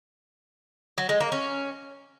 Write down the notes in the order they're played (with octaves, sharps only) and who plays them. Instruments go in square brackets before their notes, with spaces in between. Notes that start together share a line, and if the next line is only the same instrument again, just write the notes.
[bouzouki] F#3
G#3
A#3
C#4